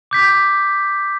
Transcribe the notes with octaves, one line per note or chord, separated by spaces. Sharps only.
D6 G6 B6